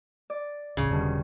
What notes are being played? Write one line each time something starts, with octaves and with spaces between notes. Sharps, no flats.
D5
D1 A1 C#3 G#4
E1 G2 B2 D3 D#3